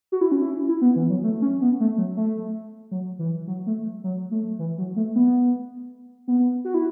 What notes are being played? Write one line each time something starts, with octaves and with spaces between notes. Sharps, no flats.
F#4
E4
C#4
E4
E4
B3
E3
F#3
A3
C#4
B3
A3
F#3
A3
F#3
E3
F#3
A3
F#3
A3
E3
F#3
A3
B3
B3
F#4
E4